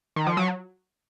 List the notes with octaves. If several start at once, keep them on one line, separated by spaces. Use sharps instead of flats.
D#3
F3
F#3